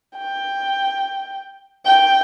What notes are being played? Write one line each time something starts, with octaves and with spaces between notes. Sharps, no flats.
G5
G5